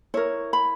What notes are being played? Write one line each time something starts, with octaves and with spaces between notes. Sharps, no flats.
E4 A#4 C#5
B5